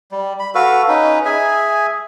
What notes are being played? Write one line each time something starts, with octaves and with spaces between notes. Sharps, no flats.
G3
B5
F#4 A4 B4 F5
C#4 D#4 B4
G#4 E5 G#5